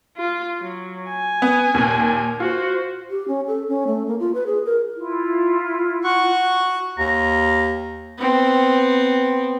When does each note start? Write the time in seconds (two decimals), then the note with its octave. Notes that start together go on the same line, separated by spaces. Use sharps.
0.17 F4
0.61 F#3
1.09 G#5
1.42 B3
1.74 D#2 A#2
2.40 F4 F#4 C5
3.10 G4
3.28 C#4
3.47 A4
3.68 C#4
3.87 A3
4.07 A#3
4.20 F4
4.35 B4
4.46 G#4
4.66 A#4
4.96 E4 F4
6.04 F#4 F#5 C#6
6.98 D#2 A#5
8.18 B3 C4